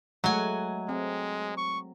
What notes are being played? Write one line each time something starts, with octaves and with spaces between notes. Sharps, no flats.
F#3 G#3 A3 F#5 G#5
G#3 C4
C#6